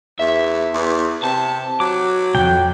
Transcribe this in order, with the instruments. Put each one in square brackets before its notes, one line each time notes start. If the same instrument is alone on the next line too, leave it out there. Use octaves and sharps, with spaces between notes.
[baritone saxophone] E2 [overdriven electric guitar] E5
[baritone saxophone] E2
[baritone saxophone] C3 [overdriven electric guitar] A5
[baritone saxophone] F#3 [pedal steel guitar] D6
[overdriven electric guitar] B1 F2 [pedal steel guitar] G5